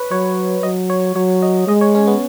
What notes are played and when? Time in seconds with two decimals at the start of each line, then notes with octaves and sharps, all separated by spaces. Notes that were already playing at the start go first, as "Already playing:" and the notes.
Already playing: B4 C#5
0.11 F#3 C#5
0.63 F#3 D#5
0.90 C#5
1.15 F#3 C#5
1.42 D#5
1.67 G#3 D#5
1.81 C#5
1.95 C#4
2.07 B3